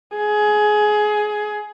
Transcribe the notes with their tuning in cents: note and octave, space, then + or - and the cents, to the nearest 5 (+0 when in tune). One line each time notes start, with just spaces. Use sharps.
G#4 +20